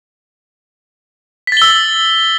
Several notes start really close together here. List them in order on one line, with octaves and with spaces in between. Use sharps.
B6 A6 G7 E6